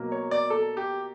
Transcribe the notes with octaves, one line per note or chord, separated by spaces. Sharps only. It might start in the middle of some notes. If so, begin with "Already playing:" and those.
Already playing: B2 F#3 A#3
C#5
D5
A4
G4